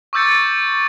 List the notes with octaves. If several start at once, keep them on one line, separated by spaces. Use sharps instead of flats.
C#6 D6 E6 G6 A6 C#7